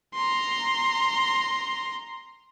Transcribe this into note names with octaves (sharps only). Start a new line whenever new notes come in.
A#5 C6